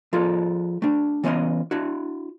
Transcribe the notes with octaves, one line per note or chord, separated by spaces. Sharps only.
F3 F4 G#4 A4
A3 D4
E3 B3 C#4 D#5 C6
D4 E4 F#4